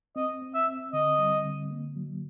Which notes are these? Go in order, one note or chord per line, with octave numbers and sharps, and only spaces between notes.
C4 D#5
C4
E5
C4
D3 D#5
G3
D3
A#3
F#3